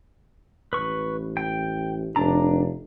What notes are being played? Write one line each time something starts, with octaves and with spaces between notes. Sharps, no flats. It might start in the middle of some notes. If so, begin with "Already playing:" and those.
A1 B4 C#6
G5
F1 D4 A#5